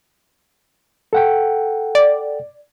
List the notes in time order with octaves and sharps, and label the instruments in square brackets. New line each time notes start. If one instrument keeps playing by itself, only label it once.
[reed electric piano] A4 F#5 G5
[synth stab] D5